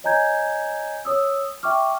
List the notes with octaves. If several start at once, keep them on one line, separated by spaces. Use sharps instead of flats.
C#5 D#5 G#5 A#5 G6 G#6
C#5 D#6 E6
E5 G5 C#6 D6 F6